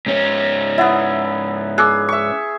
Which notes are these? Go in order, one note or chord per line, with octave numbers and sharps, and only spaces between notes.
G#2 C#4
B3 E4 E5 F#5
G#4 D6 E6 F#6
E5 C#6